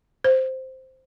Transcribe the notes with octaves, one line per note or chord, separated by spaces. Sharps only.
C5